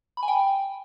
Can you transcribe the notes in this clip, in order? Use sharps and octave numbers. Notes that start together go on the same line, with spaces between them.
B5
G#5
G5